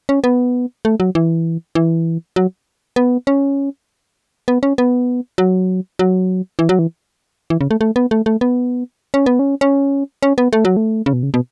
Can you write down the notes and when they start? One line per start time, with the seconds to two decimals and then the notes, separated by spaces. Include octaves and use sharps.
0.09 C#4
0.24 B3
0.85 A3
1.00 F#3
1.15 E3
1.75 E3
2.36 F#3
2.96 B3
3.27 C#4
4.48 B3
4.63 C#4
4.78 B3
5.38 F#3
5.99 F#3
6.59 E3
6.69 F#3
6.79 E3
7.50 E3
7.61 C#3
7.71 A3
7.81 A3
7.96 B3
8.11 A3
8.26 A3
8.41 B3
9.14 C#4
9.26 B3
9.39 C#4
9.61 C#4
10.23 C#4
10.38 B3
10.53 A3
10.65 F#3
10.77 A3
11.06 C#3
11.13 B2
11.23 C#3
11.34 B2